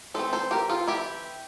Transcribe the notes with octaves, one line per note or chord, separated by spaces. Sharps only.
E3 A3 C4 A4 C5
A4 C5
G4 A#4
F4 A4
E4 G4